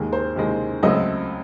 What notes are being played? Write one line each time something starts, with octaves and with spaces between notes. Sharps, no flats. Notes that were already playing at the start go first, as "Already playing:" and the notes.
Already playing: D#2 D#3 G#3
C5
D#2 D#3 G#3
C#2 C#3 F#3 A3 C4 D#5